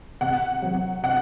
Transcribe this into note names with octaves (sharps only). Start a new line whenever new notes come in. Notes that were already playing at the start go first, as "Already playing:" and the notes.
C3 F#5
F#3 C4
C3 F#5